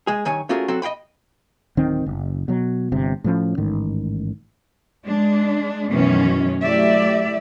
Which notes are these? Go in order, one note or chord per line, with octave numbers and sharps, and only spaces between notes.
G#3 G#4
G2 D#3 C#5 G#5
A3 C#4 F4 F#4 G#4 A#4
F#3 C4 F#4 A4
D#5 F5 G5 B5
D1 D#3 C4
F#1
B2 F#3
G1 C3
A2 F3 C#4
A1 G#2 D#3
G#3 D4
F#2 B2 D#3 E3 A3 C#4
F#3 A3 E4 G4 D5 E5